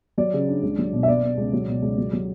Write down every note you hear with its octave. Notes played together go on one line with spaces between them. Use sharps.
F#3 D5
C#3
D4
C#2
F#3
B2
E5
B3 D5
B3
C#2
F#3
B2
C#2
F#3
F#3